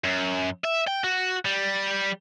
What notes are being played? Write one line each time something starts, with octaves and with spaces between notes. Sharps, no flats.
F#2
E5
G5
F#4
G3